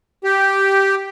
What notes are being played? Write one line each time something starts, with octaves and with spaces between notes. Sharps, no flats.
G4